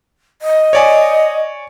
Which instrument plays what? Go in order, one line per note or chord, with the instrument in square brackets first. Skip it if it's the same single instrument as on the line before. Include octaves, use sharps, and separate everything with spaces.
[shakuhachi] D#5
[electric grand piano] C#5 D5 G#5